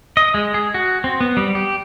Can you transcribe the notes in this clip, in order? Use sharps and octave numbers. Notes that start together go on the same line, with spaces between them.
D#5
G#3
G#4
F#4
C4
B3
G3
G4